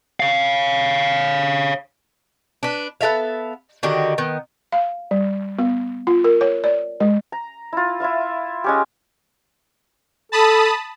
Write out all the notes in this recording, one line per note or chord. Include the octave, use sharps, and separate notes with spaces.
C#5 F5
D4 B4
B3 A4 E5 F5
D3 D#3 F#4 G4
D#3 B3
F5
G3
B3
F4
A#4
C#5
D5
G#3
A#5
E4 F4
E4 F4 E5 F5
G#3 C#4 G4
A4 A5 B5 D#6